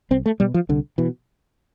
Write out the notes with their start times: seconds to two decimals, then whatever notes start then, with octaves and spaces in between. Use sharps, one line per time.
0.11 C2 C4
0.26 A3
0.40 B2 G3
0.54 F3
0.69 C2 D3
0.98 B2 E3